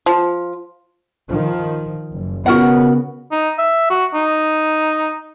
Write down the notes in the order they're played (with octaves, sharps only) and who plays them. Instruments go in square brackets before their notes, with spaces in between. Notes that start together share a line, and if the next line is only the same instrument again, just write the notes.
[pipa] F3
[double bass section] D#3 F3
F#1
[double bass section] C#3 B3 [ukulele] F#4 A#4 F#5
[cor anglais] D#4
E5
F#4
D#4